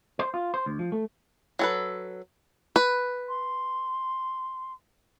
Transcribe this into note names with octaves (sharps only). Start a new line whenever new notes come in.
C5
F4
C5
D2
F3
A3
F#3 A4 B4
B4
C6